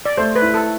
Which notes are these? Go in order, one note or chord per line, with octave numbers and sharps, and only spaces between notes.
D5
A3 C5
B4
E4
A4